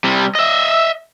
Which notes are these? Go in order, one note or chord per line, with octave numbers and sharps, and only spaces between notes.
C3 G3
D#5 E5